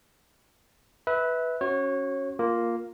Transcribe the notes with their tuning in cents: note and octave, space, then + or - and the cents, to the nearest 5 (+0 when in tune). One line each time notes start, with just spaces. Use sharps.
B4 +0 E5 -25
C#4 +0 F#4 +0 C#5 -30
A#3 +0 F4 +0